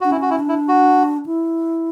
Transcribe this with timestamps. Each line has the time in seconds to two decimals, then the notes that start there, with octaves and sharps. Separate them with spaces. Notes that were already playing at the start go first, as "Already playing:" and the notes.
0.01 D4 F#4
0.11 C#4 E4
0.22 F#4
0.30 E4
0.40 D4
0.49 E4
0.68 F#4
1.26 E4